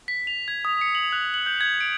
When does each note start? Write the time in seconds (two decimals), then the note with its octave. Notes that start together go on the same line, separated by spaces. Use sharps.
0.08 B6
0.27 F7
0.48 G#6
0.65 D#6
0.81 C#7
0.95 F#7
1.12 F#6
1.34 F#7
1.46 G6
1.61 G#6
1.81 D7